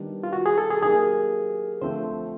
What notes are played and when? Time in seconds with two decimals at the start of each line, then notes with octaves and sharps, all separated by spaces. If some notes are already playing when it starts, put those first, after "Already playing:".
Already playing: D#3 G3 B3 D4 G4
0.23 F4
0.33 F#4
0.46 G#4
0.58 A4
0.70 G#4
0.82 F#3 A#3 D#4 G4 G#4 A#4
1.81 D3 F3 A3 C4 C5